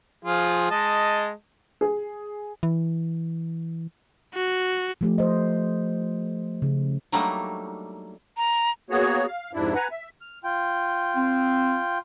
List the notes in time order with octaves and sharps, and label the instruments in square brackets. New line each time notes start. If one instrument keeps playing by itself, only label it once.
[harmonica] F3 F4 G#4
G#3 D#5 A5
[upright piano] G#4
[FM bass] E3
[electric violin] F#4
[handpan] F3 A3 G4
C5 D#5
C#3
[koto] F#3 G3 A3 A#3 D4 D#4
[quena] A#5
[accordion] A#3 B3 F#4 G#4 C#5
F5
F2 G#2 C3 D4 E4
B4 F#5 G#5 A#5
E5
[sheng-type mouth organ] F6
F4 G5
[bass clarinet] C4